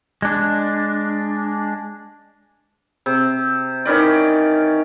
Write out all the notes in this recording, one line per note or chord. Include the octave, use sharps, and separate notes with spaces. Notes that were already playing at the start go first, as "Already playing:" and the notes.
G#3 D4
C3
D#3 E3 C#4 D5